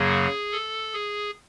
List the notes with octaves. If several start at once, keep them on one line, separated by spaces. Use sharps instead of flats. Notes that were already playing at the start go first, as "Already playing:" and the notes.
Already playing: F#2 C#3 F#3 A#3 G#4
A4
G#4